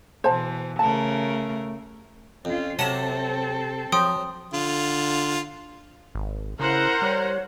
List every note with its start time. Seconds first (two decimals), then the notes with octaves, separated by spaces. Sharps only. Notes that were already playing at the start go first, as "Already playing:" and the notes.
0.24 B2 E3 C5 A5
0.79 C#3 A3 A#4 A5
2.45 F2 C#4 F4
2.79 C3 F#3 C4 A4 F#5 A5 A#5 E7
3.92 F3 F#3 G5 C6 D#6
4.54 D3 F4
6.15 G#1
6.60 C#3 E4 A#4 C5 F#5
7.02 G3 C#5